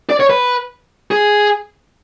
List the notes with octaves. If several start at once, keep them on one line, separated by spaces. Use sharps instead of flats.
D5
C#5
B4
G#4